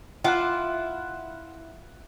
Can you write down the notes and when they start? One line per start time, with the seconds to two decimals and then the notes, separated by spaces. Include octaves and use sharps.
0.24 E4 F4 F#5 D6 F#6